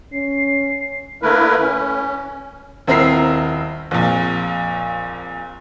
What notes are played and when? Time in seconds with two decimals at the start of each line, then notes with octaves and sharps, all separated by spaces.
0.12 C#4 C7
1.21 D3 A3 A#3 E4 A#4 B4
1.61 C#4
2.87 D#1 C4 E4 A#4 A#5 C7
3.91 A#1 F2 A#2